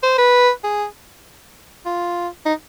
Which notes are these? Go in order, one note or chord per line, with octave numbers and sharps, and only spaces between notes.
C5
B4
G#4
F4
D#4